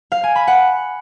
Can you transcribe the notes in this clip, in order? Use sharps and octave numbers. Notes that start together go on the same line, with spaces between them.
F5
G#5
B5
F#5